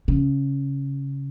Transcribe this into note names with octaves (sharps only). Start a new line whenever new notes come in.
C#3